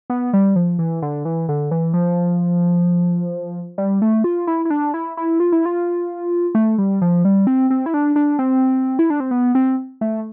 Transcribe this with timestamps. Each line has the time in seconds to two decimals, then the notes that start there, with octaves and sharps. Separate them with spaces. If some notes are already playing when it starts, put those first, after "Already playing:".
0.10 B3
0.33 G3
0.56 F3
0.79 E3
1.02 D3
1.25 E3
1.49 D3
1.71 E3
1.94 F3
3.78 G3
4.02 A3
4.24 F4
4.47 E4
4.65 E4
4.70 D4
4.94 E4
5.17 E4
5.40 F4
5.52 E4
5.66 F4
6.55 A3
6.78 G3
7.02 F3
7.25 G3
7.47 C4
7.70 C4
7.86 E4
7.94 D4
8.16 D4
8.39 C4
8.99 E4
9.10 D4
9.20 C4
9.31 B3
9.55 C4
10.01 A3